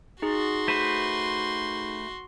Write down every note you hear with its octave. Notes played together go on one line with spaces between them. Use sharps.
D#4 F#4 G#4 C6
A3 B4 C5